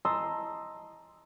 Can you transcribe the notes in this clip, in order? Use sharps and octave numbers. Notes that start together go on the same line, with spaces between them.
D#5 A5 A#5 C6 D#6 E6